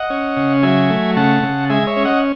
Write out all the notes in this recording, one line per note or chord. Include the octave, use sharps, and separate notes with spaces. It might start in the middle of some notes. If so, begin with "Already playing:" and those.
Already playing: D#5 F#5
C#4
C#3
F#3 E5 G#5
A3
C#3 F#5 A5
C#3
G#3 E5 G#5
C#5 E5
C#4
D#5 F#5